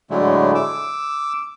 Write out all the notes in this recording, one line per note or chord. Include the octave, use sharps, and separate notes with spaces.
A2 D3 F#3 G#3 A3
D6 E6